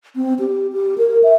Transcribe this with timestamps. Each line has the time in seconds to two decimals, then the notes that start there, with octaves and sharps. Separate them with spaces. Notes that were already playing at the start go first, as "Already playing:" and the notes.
0.16 C4
0.39 G4
0.72 G4
0.98 A#4
1.23 E5